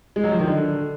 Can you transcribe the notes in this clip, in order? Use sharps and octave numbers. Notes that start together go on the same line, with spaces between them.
G#3
F#3
F3
D#3
D3